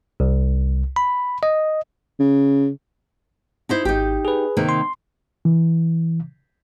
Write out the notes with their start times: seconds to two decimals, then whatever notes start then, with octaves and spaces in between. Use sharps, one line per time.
0.20 C2
0.96 B5
1.43 D#5
2.19 C#3
3.69 D#4 E4 C5
3.85 G#1 D#4 G4
4.25 G#4 B4
4.57 C3 D#3 A#3
4.69 C6
5.45 E3